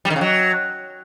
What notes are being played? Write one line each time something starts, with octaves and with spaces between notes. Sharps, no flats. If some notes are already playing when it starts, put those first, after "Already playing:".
G3
D#3
C#3
F#3